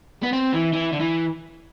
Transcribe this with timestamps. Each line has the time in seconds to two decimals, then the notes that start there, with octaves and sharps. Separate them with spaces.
0.23 B3
0.32 C4
0.53 E3
0.73 E3
0.93 D3
1.00 E3